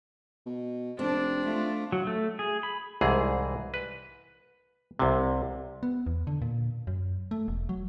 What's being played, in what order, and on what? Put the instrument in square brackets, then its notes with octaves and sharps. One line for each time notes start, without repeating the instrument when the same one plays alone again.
[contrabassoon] B2
[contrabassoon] F1 [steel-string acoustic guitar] C4 [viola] D4
[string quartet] A3 F4
[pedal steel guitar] F#3
A3
G#4
B5
[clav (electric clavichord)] C2 G#2 E3 G#4
B4
C2 C3
[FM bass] B3
E2
D3
A#2
F#2
A3
E1
F#3